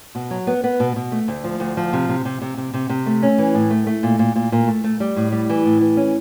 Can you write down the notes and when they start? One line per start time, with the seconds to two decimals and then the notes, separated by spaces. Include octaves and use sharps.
0.15 B2
0.31 F#3
0.47 B3
0.64 B3
0.80 B2
0.96 B2
1.12 A3
1.28 D2
1.44 F3
1.60 D2
1.77 F3
1.93 C3
2.09 C3
2.25 C3
2.42 C3
2.57 C3
2.74 C3
2.89 C3
3.06 A3
3.23 C#4
3.38 E3
3.54 A2
3.70 A3
3.87 A3
4.03 A#2
4.19 A#2
4.36 A#2
4.52 A#2
4.68 A3
4.84 A3
5.00 G3
5.16 A2
5.32 G3
5.50 E3
5.65 A2
5.81 E3
5.97 C#4